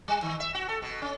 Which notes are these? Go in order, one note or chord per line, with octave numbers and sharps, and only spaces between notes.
G3
D#3
E5
F#4
A4
B2
C#4